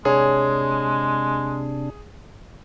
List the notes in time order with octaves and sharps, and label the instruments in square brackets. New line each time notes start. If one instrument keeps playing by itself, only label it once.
[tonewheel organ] C3 D4 [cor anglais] G#3 [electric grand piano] G#4 [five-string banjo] C#5